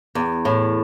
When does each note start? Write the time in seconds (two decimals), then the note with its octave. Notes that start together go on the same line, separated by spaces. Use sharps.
0.15 E2
0.45 A2